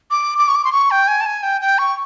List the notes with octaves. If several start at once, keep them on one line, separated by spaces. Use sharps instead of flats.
D6
D6
C#6
D6
C6
C#6
G5
G#5
A5
G#5
G5
G5
C#6